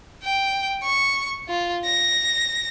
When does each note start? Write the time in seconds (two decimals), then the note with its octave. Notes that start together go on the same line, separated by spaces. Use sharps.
0.24 G5
0.83 C#6
1.48 F4
1.85 A#6